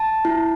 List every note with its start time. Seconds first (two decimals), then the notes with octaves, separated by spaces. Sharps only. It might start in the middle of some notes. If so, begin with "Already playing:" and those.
Already playing: A5
0.25 E4